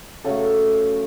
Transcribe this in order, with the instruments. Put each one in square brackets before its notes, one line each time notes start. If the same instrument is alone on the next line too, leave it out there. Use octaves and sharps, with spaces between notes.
[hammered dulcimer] C#3 F#3 A3 A4